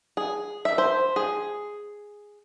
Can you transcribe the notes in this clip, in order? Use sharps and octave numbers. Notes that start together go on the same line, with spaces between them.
G#4
E5
C5
G#4